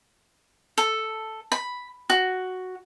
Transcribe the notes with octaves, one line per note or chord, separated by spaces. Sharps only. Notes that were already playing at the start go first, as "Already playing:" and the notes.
A4
B5
F#4